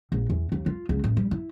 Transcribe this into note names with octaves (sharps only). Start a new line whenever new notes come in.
A#1
E2
D#2
F4
C#2
A1
G3
E4